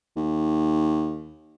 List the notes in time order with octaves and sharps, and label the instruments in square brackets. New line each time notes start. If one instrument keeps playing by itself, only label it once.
[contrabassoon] D#2